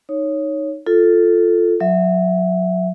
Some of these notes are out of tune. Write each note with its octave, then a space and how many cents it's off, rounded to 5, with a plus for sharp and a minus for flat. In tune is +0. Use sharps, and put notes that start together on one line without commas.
D#4 +0 C#5 +0
F4 +0 A4 +0
F#3 -25 E5 +0